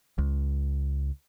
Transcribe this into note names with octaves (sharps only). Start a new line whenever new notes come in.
C#2